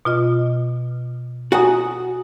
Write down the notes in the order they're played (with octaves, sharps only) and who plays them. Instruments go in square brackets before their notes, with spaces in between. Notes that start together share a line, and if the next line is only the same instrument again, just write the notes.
[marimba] B2 F4 D#5
[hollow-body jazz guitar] F#4 F#5 [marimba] G#5 A#5 D#6